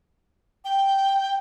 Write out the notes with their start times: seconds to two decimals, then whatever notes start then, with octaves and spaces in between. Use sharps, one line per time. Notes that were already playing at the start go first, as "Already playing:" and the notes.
0.65 G5